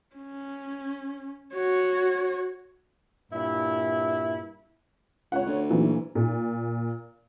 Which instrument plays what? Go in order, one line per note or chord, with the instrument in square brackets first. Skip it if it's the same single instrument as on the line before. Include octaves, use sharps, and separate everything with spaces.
[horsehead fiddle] C#4
F#4 C#5
[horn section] G2 A#2 E4
[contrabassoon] C#2 [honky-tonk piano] C#5 F#5
[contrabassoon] D2
[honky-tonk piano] A#2 E3 F#3
A#2